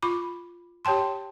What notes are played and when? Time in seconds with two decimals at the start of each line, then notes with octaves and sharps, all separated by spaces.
0.03 F4 B5 D6
0.85 G4 C#5 G5 A5 C6